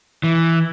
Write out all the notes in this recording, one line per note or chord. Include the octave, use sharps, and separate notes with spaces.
E3